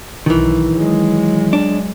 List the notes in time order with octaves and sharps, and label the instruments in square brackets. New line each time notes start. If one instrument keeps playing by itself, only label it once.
[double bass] B1 [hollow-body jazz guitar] D#3 E3
[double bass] F#3 G#3
[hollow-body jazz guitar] D4